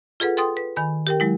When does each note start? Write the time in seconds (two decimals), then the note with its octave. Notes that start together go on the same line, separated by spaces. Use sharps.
0.20 F4 G#4 A4 B4 F#5
0.37 A4 G5 C6 D#6 A6
0.57 B4
0.76 D#3 G#5 B5
1.07 G4 A#4 G5
1.20 F#3 G#3 E4